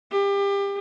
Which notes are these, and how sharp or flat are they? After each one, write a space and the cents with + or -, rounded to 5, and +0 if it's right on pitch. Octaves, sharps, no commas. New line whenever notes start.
G4 +30